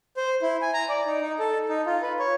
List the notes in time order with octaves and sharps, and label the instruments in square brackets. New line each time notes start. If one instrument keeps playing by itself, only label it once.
[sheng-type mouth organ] C5
E4
G#5
A#5
D5
D#4
D#4
A4
D#4
F4
B4
C#5